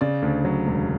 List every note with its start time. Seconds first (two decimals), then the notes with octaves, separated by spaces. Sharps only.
0.01 C#3 D5
0.22 D2
0.45 F#3
0.67 E1